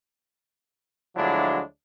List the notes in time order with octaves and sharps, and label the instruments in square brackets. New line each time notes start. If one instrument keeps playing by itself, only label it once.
[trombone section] D2 F3 F#3 G#3 D4 E4